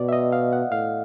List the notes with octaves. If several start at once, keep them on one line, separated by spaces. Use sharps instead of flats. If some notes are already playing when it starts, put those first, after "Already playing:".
Already playing: B2 D5
E5
D#5
F5
F#5
A2 F5